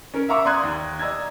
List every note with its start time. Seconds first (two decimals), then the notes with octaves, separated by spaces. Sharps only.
0.14 C#4 A#4
0.29 E5 F5 A#5 C#6 D6 E6
0.45 D5 A#5 C6 D#6 F#6 G#6
0.63 D#2
0.99 D5 D#5 A#5 E6 G#6